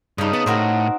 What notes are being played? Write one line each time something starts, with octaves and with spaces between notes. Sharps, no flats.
G2 C#3 D#4
B3 A5
A2 C4 F#4 A#4